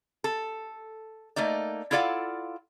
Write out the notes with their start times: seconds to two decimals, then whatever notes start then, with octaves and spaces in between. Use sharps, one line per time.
0.24 A4
1.36 A3 A#3 D#4 D5
1.91 E4 F4 A4 D5 F5 F#5